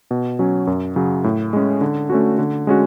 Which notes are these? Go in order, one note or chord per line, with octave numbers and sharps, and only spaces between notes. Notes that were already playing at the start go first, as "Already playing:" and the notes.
B2
F#3 C#4
F#2
C#3 F#3
A2
G#3 C#4
D3
A3 C#4 F#4
D3
G#3 C#4 F#4